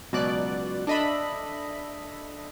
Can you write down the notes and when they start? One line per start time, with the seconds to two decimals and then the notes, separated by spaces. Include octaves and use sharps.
0.12 C#2 B2 F#3 D5 F#6
0.87 D4 A4 D#5 E5 B5